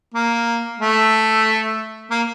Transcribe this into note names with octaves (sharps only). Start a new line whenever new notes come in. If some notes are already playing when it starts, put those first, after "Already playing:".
A#3
A3
A#3